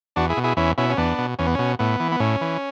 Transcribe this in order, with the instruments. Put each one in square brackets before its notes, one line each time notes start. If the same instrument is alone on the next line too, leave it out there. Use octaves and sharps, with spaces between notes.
[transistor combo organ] E2 D4 F#4
E4 G#4
B2
E4 G#4
E2 C#4 E4
B2 C#4 E4
C#4
E2 B3 D4
B2
E2 C#4
B3
B2 C#4
A2 B3
E3
B3
A2 C#4
E3